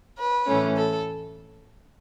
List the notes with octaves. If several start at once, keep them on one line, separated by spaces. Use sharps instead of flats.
B4
A2 E3 A3 C#4
A4